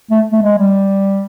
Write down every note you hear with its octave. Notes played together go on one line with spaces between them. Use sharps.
A3
A3
G#3
G3